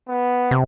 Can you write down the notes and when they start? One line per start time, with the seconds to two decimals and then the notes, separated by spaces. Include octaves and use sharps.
0.09 B3
0.51 C3